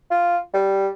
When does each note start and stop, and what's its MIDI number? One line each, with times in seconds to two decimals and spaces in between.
0.11 0.38 65
0.54 0.89 55